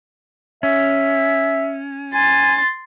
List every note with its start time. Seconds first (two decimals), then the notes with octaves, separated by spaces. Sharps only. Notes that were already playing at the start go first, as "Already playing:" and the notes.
0.63 C#4 E5
2.14 G#5 C6 A6